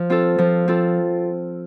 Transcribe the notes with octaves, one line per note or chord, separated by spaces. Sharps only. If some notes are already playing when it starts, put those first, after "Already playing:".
Already playing: F3
C4 F4 A4
F3
C4 F4 A4